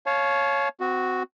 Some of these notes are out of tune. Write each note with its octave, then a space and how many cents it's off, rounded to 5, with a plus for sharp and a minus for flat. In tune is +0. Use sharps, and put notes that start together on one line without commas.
C#5 +0 F5 +0 A5 -40
C4 -30 F#4 +0